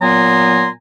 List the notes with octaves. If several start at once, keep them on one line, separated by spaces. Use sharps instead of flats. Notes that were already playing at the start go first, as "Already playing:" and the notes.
A#2 F#3 B3 G#5 A#5 C6